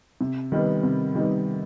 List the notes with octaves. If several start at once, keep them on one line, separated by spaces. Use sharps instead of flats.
C3
D#3 G3 B3 D#4
C3
D#3 G3 B3 D#4